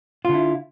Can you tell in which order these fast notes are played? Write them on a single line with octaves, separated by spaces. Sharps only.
F4 D3 E4